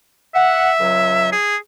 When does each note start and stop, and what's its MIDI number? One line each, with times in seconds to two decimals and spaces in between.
0.35 1.29 76
0.35 0.70 78
0.79 1.31 37
0.79 1.31 54
1.32 1.57 68